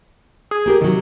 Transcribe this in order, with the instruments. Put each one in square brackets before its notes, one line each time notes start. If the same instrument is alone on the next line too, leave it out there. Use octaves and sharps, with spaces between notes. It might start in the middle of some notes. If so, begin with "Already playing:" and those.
[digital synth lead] G#4
[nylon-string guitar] A#3 G4 A#4
[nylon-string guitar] C3 F#3 [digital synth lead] D#3